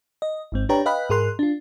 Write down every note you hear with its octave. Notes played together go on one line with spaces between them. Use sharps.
D#5
G#1 G#2 C4
D4 G4 B4 C#5 G5 A#5
B4 D#5 F5 G5 B5 F#6
G#2 G#4 A#4 C6 F#6
D4 F4